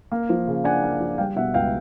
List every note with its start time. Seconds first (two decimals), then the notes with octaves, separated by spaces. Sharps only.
0.12 A#3
0.29 F3
0.47 C#3
0.64 D4 F#5 G#5
0.83 A#3
1.00 F3
1.18 G3 F5 G5
1.36 B2 E5 F#5
1.54 C#2 F5 G5